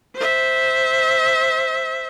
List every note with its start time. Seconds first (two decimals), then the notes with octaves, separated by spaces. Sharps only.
0.16 C5 E5